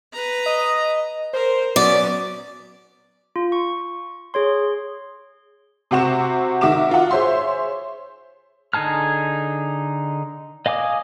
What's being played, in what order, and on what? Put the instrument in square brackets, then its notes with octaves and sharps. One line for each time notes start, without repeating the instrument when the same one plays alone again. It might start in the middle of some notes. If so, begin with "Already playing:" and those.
[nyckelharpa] B4 A#5
[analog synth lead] D#5
[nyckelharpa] A#4 [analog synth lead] C5
[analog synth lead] F#3 [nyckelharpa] B3 C#4 [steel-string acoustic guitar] D5
[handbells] F4
C#6
G#4 C#5 C6
[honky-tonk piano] C3 C4 F#4 F#5 C#6 E7
D#3 F#4 E5 D6 E7
F4 F#5
G#4 C5 C#5 E5 C6
[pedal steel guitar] D3 D#4 G#4 A5 F6
D#5 F5 G#5 D6 D#6